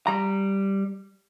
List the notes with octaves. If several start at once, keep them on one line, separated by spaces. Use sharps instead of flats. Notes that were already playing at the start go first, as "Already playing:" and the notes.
G3 A#5